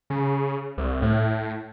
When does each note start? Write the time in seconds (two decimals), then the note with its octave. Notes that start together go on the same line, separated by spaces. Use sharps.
0.10 C#3
0.78 C2
1.02 A2